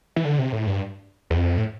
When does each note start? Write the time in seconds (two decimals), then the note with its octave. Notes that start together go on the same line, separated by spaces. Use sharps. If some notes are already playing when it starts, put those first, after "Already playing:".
0.16 E3
0.25 D3
0.39 C3
0.53 A2
0.67 G2
1.30 E2
1.36 F2
1.58 A2